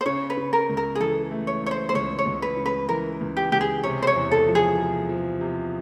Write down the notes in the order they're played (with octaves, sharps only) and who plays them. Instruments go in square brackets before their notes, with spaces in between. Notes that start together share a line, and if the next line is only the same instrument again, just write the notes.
[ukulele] C5
[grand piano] C#3 [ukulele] C#5
[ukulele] B4
[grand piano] C#3
[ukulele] A#4
[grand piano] C#2
[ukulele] A#4
G#4
[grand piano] E3 [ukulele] A4
[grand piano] A3
[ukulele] C#5
[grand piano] A3 [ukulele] C#5
[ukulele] C5
C5
[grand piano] C#2 [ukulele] C#5
[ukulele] C#5
[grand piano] C#2
[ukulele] B4
[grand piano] C#3
[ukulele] B4
[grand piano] E3 [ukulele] A#4
[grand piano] C#2
[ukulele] G4
[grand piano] C#2 [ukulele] G4
[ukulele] G#4
[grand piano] C3 [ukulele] C#5
[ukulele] C5
C#5
[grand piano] E2
[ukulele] A4
[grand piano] F3
[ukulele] G#4
[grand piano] C3
F3
C3